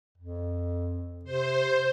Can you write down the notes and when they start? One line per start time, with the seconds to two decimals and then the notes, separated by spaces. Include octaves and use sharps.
0.18 F2
1.25 C3 C5